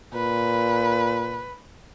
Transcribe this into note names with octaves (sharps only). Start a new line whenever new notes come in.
A#2 B4